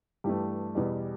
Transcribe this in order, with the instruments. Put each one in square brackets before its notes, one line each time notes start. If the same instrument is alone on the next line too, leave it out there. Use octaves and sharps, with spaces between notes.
[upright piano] G2 E3 A3 G4
E2 B2 G3